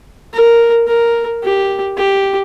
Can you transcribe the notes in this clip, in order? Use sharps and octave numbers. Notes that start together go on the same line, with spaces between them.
A#4
A#4
G4
G4